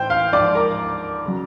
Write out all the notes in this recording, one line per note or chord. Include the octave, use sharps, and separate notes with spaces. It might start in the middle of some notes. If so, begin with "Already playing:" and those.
Already playing: A2 E3 C5 G5 G6
F5 F6
G#2 F3 D5 D6
A#4 A#5
C#3 F#3